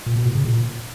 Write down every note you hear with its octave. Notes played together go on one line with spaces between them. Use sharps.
A#2
B2
A2
C#3
A#2